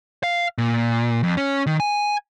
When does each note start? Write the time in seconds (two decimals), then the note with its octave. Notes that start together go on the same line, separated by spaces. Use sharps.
0.24 F5
0.58 A#2
1.23 F2
1.37 C#4
1.67 D#3
1.80 G#5